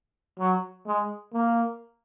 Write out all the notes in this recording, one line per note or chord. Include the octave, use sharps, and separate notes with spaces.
F#3
G#3
A#3